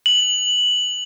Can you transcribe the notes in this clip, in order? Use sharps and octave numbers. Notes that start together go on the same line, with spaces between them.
F#7